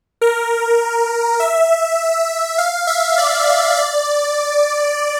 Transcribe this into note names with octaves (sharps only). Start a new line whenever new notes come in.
A#4
E5
F5
E5
D5
D5